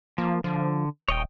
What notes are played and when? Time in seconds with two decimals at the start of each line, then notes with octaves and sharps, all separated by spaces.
0.18 F3 A#3
0.44 D3 F3
1.08 D#1 C#5 D#5 G5